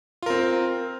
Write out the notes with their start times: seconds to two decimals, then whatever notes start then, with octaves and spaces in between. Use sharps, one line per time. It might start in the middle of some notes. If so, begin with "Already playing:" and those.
0.22 F4
0.26 A#4
0.30 C4